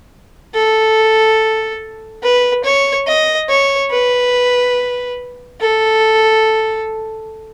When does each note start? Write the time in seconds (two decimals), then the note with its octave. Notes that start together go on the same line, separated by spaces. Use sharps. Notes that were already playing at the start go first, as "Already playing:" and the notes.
0.54 A4
2.23 B4
2.64 C#5
3.07 D#5
3.49 C#5
3.91 B4
5.61 A4